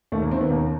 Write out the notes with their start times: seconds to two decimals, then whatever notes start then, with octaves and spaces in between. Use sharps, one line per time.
0.12 D#2 A3
0.22 A#3
0.31 D#3 C4
0.41 B3
0.50 D#2 A#3